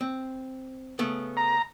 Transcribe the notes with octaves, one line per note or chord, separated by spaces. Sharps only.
C4
C#3 A3 B3
A#5